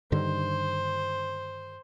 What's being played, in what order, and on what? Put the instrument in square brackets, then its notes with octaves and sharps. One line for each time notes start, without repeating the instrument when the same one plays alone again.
[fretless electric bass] G2 D3 D#3 [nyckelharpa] C5